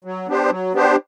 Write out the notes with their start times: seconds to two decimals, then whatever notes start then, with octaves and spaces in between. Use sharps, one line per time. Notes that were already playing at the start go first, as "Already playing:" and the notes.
0.04 F#3
0.27 B3 D4 G4 C5
0.50 F#3
0.73 B3 D4 G4 C5